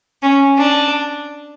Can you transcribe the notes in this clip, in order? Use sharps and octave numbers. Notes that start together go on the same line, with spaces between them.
C#4
D4